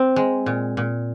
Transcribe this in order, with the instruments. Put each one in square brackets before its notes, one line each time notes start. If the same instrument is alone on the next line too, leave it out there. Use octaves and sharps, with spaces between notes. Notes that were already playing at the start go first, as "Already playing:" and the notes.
Already playing: [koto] C4
G#3
A#2
A#2